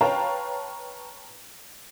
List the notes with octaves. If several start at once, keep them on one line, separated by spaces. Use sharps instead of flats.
B4 C#5 F5 G5 A5 A#5